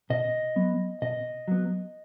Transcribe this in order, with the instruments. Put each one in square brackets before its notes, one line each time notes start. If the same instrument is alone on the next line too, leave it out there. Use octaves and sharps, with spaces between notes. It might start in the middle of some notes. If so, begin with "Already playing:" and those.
[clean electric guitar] B2 D#5
F#3 B3
B2 D#5
F#3 B3